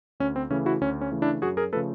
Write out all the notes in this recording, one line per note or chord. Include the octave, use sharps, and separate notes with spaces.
D2 C#4
C4
C#3 E3 A3 C#4
E4 F#4
D2 C#4
C#4
C#3 E3 A3
D4 E4
F#2 F#4 G#4
G#4 A#4
C#3 F3 A3 A4 B4